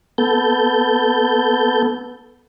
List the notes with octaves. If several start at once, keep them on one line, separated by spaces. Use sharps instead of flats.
B3 A4 G6